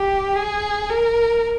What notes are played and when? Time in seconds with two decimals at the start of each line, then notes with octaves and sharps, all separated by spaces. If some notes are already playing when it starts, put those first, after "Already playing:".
Already playing: G4
0.36 G#4
0.90 A#4